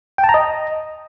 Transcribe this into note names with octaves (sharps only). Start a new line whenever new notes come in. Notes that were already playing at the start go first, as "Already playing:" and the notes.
G5
A5
A#5
D#5